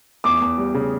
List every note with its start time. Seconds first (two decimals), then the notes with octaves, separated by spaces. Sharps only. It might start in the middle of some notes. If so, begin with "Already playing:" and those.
0.24 E2 D6
0.41 E2
0.58 G3
0.74 C#3